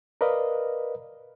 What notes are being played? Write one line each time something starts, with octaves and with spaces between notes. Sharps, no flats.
A#4 B4 D5 D#5 F5